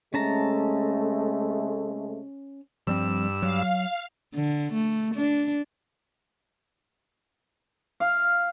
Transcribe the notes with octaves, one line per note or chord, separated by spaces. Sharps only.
C3 G#3 A3 C#4 A5 A#5
G2 F3 G3 C4 E6
F#3 F5
D3
A3
D4
F5